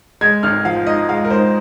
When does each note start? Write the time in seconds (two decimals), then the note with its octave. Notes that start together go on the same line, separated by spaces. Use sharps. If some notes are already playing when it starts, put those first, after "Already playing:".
0.21 G#3 G#6
0.43 G#1 F6
0.65 F3 F5
0.87 G#2 D#5
1.09 G#3 F5
1.25 A#4
1.30 G#2 C5